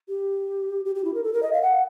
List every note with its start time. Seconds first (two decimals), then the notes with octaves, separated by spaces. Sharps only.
0.09 G4
0.85 G4
0.95 G4
1.04 E4
1.14 A#4
1.24 A4
1.33 A#4
1.43 D#5
1.53 F5
1.62 F#5